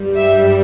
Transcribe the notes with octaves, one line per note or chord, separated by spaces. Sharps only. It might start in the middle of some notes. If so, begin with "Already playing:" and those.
Already playing: G2 G3
E5